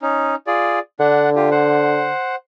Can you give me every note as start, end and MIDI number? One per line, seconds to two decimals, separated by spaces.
0.02 0.35 61
0.02 0.35 63
0.47 0.79 65
0.47 0.79 68
0.47 0.79 74
1.00 2.11 50
1.00 1.30 62
1.00 1.30 78
1.36 1.49 65
1.36 1.49 67
1.51 2.36 72
1.51 2.36 78